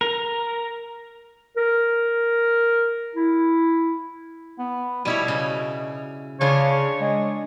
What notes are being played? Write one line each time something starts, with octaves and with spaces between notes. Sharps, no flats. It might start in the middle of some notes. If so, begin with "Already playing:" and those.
A#4
A#4
E4
B3
B2 G3 E4 C#5
C#3
C#3 D4 F4 C#5
G#3